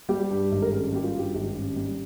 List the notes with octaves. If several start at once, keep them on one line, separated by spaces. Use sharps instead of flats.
G3 G4
G2
G#1
A#4
C#4 G#4
G3 G4
F4
G2 G4
G#1 G4
C#4
G3